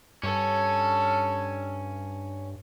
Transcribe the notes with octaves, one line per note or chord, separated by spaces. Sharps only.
G2 C#4 A4